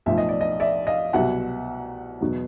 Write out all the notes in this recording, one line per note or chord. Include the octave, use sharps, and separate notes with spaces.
B1 A2 F3 E5
D#5
D5
D#5
D5 E5
D#5 F5
C2 B2 F#3 E5 F#5
E2 B2 F#3